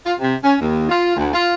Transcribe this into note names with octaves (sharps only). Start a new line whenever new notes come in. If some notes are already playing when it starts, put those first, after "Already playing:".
F4
C3
C#4
D#2
F4
D2
F4